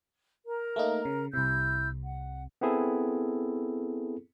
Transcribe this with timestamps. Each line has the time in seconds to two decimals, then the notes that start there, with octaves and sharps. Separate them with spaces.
0.46 A#4 A#5
0.76 A3 A#3 D#4
1.05 C#3
1.34 C2 C3 E4 E6 G6
2.02 F#5
2.61 B3 C4 E4 G#4 A4